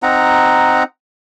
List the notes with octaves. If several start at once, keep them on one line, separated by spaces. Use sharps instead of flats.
C4 D#4 F#5 A#5